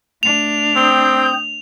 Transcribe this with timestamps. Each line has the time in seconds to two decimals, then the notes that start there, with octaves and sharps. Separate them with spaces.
0.23 A3 D4 F7
0.76 C4 G5 D#6 G6